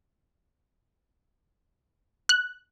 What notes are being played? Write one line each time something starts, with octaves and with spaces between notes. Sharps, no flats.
F#6